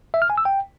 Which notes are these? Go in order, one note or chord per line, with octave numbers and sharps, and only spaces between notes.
E5
F6
G#5
E6
G5